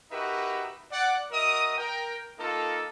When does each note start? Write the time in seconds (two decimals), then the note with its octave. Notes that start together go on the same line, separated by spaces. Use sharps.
0.11 D#4 F#4 G4 A#4 B4 E5
0.92 D5 F#5
1.31 F#4 A#4 D#5 E5 D#6
1.77 A#4 G5
2.39 A#3 D#4 F4 A4